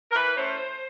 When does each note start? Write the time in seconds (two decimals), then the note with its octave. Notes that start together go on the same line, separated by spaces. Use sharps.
0.11 A#4
0.16 E3 B4
0.36 A3 C#4 E4 C5